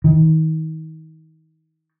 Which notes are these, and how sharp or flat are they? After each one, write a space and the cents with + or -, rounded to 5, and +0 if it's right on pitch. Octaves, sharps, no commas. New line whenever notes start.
D#3 +35